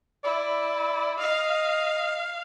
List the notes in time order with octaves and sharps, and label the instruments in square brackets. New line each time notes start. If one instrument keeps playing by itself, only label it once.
[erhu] E4 [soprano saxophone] D5
[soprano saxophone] D#5 [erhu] F5